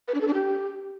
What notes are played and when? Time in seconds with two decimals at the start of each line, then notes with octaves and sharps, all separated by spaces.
0.08 B4
0.14 D4
0.21 A4
0.27 D4
0.34 G4